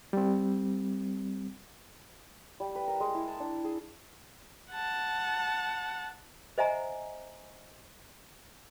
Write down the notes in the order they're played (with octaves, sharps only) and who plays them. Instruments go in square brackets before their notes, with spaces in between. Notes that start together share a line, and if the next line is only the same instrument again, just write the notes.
[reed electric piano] G3 C4
[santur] G3
B4
A#4
G#3
E4
A5
D4
G#4
[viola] F#5 A5
[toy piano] C5 D#5 E5 F#5 G#5 A#5